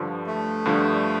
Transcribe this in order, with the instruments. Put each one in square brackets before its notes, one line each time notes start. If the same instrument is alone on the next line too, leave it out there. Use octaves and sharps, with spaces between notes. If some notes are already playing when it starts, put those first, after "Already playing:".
Already playing: [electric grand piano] G2 D3 F3
[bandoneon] A3
[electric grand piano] G2 D3 F3